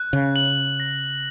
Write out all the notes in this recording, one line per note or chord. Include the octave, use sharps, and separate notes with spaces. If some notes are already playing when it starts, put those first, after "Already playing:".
Already playing: F#6
C#3
F#7
A#6